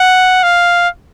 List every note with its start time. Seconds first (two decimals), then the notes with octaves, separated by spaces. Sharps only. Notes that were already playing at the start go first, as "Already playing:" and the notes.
Already playing: F#5
0.43 F5